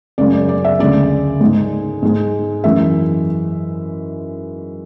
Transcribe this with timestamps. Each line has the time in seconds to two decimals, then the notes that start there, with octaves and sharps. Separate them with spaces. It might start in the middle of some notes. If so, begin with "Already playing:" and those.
0.18 F#2 C#3 G#3 D5
0.33 D5
0.49 D5
0.65 E5
0.79 D2 C#3 G#3 D5
1.41 G#2 G#3
2.02 G#2 G#3
2.64 F#2 E3 G#3 E5